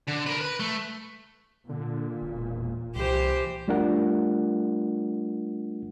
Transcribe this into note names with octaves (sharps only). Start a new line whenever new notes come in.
D3
A#4 B4
B4
A3
A#2 D3
E1
C2 E3 G4 C5
G3 A3 D4 F4 A#4 F#5